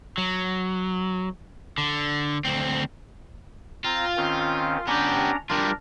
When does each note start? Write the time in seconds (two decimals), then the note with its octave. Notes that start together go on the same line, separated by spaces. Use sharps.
0.18 F#3
1.78 D3
2.45 D2 C4
3.85 C4 F4 A#5
4.17 D#3 C4 C#4
4.87 B3 C#4 D4 G4 A#5
5.50 G3 D4 F4 A#4